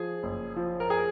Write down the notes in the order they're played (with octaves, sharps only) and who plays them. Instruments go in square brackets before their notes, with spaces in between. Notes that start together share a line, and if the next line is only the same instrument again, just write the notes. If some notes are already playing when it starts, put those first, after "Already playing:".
Already playing: [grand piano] F3 G#4
F#1
F3
A#4
G#4